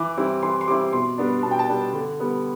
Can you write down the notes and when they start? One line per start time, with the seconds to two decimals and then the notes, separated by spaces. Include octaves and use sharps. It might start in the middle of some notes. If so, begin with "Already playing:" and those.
Already playing: E3 D6
0.17 G3 C4 E4
0.42 E3 C6
0.61 C6
0.68 G3 C4 E4 D6
0.93 B2 C6
1.18 G3 B3 D4
1.43 B2 A5
1.51 G5
1.59 A5
1.69 G3 B3 D4
1.93 D3
2.20 G3 B3